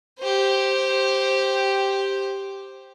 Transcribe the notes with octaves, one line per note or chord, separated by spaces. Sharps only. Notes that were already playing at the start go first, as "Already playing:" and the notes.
G4 C5